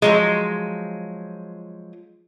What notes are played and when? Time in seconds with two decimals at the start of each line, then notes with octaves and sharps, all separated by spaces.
0.02 F3 F#3 G#3